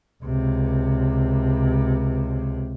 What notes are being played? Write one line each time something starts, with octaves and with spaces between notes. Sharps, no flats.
C#2 C3